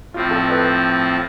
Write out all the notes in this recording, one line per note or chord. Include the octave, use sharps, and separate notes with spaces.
A2 F3 C4 F4
A4
B4